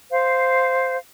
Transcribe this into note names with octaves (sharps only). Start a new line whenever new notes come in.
C5 F5